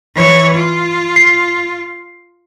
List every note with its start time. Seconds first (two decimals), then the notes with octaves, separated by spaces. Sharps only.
0.15 E3 C#5
0.54 F4
1.16 C7